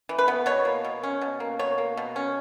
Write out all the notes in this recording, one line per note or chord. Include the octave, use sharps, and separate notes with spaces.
E3
B4
B3
B2 C#5
A#3
B2
C#4
B2
A#3
B2 C#5
A#3
B2
C#4